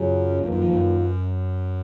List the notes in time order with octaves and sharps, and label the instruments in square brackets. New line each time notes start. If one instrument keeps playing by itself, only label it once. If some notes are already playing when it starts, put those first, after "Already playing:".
Already playing: [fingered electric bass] F#2 [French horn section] C#3 F#3 C#4 F4 G#4
[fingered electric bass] F2 [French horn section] D#3 A#3 F4 B4
[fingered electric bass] F#2
F3
F#2